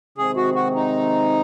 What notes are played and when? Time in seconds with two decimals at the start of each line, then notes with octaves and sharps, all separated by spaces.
0.18 C3 D#3 G#3 C4 G#4
0.37 F#4
0.55 F#4
0.75 D#4